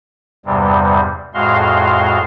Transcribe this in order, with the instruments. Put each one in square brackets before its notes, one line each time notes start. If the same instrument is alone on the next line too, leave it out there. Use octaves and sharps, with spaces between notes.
[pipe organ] E2 G2 C3 G3
F2 A2 G#3 F#4 F5 C6